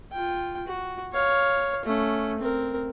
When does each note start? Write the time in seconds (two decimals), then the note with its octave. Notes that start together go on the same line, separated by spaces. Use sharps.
0.12 F4 G5
0.67 F#4
1.13 C#5 F5
1.85 A3 C#4
2.39 C4 A#4